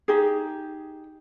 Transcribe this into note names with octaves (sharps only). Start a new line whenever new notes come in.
D#4 G4 G#4